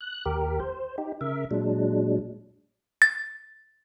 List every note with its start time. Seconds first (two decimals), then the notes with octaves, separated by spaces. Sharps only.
0.01 F#6
0.26 D#2 G4 A#4
0.60 C5
0.98 D#4 G4
1.21 C#3 A#4 E5
1.51 A#2 F#3 G#3 D4
3.02 A6